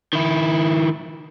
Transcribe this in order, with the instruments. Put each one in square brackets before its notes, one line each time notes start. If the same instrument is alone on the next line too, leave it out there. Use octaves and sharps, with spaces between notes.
[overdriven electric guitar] D#3 E4